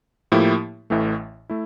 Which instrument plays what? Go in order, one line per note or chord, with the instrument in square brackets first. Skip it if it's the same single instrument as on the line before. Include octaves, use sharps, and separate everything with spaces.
[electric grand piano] A2 F3 A#3 E4 G4
A1 A2 E3 A3
A3 E4